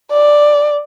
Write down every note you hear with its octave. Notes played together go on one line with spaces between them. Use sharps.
D5